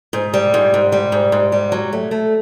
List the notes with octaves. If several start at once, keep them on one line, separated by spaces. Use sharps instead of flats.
G#2
G3
G#2
G#2
G3
G#2
G#2
G3
F#3
A3
A3